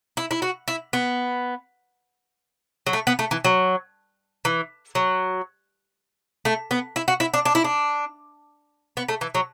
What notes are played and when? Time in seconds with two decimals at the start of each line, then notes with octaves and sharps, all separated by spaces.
0.17 E4
0.31 E4
0.42 F#4
0.68 E4
0.93 B3
2.87 F#3
2.93 A3
3.07 B3
3.19 A3
3.31 E3
3.45 F#3
4.45 E3
4.95 F#3
6.45 A3
6.71 B3
6.96 E4
7.08 F#4
7.20 E4
7.34 D4
7.45 D4
7.55 E4
7.64 D4
8.97 B3
9.09 A3
9.21 E3
9.35 F#3